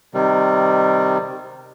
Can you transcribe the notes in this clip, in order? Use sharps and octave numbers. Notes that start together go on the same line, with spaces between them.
C3 D#3 G3